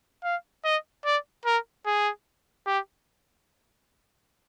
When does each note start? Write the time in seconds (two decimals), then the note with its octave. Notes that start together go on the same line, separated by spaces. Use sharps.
0.23 F5
0.64 D#5
1.05 D5
1.45 A#4
1.86 G#4
2.66 G4